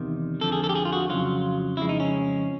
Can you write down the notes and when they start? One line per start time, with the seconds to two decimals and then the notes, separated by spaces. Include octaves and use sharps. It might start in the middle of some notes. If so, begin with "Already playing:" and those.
Already playing: E2 C3 D#3
0.41 F2 D3 F3 A4
0.52 G#4
0.64 A4
0.69 G4
0.75 G#4
0.85 F4
0.93 F#4
1.09 F2 C#3 F#3 F4
1.77 F2 C#3 F3 G#3 E4
1.89 D#4
2.00 C#4